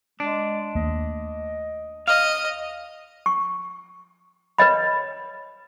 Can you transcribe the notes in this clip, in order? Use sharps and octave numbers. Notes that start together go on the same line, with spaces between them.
G#3 D4
D#2 A3 A#3 D#5
D#5 F5
C#6
B4 C#5 D#5 B5